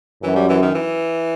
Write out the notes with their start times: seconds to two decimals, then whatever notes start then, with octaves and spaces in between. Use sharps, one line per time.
0.23 F#2 E3
0.36 G3
0.49 E3
0.62 D#3
0.74 E3